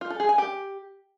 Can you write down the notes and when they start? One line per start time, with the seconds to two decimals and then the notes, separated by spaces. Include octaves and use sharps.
0.01 F4
0.10 A4
0.20 G#4
0.29 G#5
0.38 G4